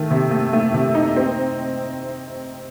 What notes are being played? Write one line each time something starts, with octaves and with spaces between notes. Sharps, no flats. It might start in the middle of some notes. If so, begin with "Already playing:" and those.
Already playing: D#3 A3
C3
A3
A3
C3
D#4
C4